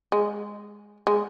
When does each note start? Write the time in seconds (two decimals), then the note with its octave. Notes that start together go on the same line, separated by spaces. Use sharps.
0.12 G#3
1.07 G#3